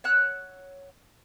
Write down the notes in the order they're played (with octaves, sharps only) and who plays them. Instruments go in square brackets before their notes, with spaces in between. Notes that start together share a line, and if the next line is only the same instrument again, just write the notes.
[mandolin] C#5 F#5 E6 F#6